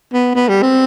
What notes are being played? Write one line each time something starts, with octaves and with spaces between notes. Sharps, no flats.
B3
B3
G3
C4